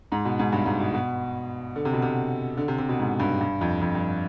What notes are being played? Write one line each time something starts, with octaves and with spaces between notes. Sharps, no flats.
G#2
B2
G#2
G2
G#2
B2
B2
D3
C3
B2
C3
D3
C3
C3
B2
G#2
G2
G2
F2
F2
G2